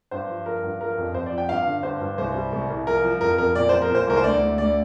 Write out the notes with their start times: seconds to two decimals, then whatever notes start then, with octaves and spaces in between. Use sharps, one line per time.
0.11 G2 C5
0.29 F3
0.46 F3 A#4
0.64 G2
0.81 F3 A#4
0.98 F2
1.14 F2 C5
1.26 D5
1.32 F3
1.38 G5
1.49 G2 F5
1.67 D3
1.83 G2 C5
2.01 G2
2.18 C2 C5
2.35 G3
2.52 C2
2.70 C2
2.87 F3 A#4
3.05 F3
3.21 F2 A#4
3.38 F2 A#4
3.55 A#2 D5
3.69 F3 C5
3.82 A#4
3.91 A#2 C5
4.07 C2 A#4
4.17 C5
4.24 D2 D5
4.41 D2
4.58 D2 D5